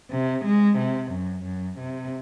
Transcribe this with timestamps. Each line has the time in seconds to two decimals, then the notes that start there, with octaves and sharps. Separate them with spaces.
0.11 C3
0.45 G#3
0.78 C3
1.12 F#2
1.44 F#2
1.79 C3